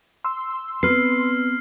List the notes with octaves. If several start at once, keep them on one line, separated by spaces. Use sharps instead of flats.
C6 E6
B3 C4 B4 F6 C7